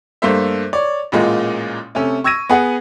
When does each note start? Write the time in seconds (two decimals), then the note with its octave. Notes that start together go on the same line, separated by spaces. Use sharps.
0.22 G2 A3 A#3 C5 E5
0.73 C#5 D5
1.12 A1 A#2 G#3 A#3
1.95 C3 A3 C#4
2.24 C#6 E6 G#6 A#6 D#7
2.49 B3 G#4 F#5